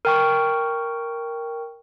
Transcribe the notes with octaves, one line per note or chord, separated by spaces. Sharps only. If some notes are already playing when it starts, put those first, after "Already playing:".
A#4 G5 C#6